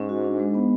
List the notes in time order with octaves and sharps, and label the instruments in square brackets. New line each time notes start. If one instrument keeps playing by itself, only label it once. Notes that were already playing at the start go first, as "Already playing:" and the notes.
Already playing: [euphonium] G#2 [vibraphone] C#4
[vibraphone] F#4
D4
G#3
B3